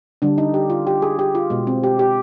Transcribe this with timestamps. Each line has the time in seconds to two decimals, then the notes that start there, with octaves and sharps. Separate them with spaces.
0.22 D3 G3 D4
0.38 D#4
0.54 G4
0.70 F4
0.87 G4
1.02 G#4
1.19 G4
1.35 F4
1.50 B2 G#3
1.67 C4
1.84 G4
1.99 G4